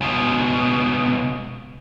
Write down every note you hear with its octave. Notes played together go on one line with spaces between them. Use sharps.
C#2 B2